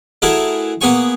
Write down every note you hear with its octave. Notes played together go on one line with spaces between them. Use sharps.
A3 E4 F#4 G#4 A#4
A#3 B3 G#4 G#5 C#6